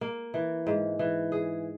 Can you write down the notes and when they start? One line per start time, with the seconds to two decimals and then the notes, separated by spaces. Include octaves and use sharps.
0.01 A#3
0.34 E3
0.67 G#2
0.99 E3
1.32 G#4